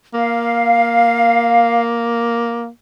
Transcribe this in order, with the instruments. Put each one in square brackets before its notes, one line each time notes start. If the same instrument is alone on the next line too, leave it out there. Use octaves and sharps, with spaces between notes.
[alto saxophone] A#3 [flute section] F5